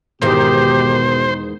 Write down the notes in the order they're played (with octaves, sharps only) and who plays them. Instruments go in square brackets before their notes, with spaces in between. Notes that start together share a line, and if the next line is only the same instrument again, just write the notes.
[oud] E2 G#2 D#3 [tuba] B2 [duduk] G4 [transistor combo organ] C5